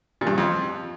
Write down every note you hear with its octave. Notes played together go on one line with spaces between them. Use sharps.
A#2
G2
C#3
F2